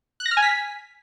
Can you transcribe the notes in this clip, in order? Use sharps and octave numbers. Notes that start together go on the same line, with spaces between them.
F#6
A#6
F6
G#5
B6